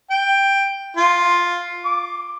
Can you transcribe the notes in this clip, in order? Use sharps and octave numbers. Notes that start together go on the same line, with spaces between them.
G5
F4
D6